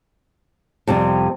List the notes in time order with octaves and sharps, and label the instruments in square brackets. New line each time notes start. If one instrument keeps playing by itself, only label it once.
[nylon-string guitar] F2 C3 G3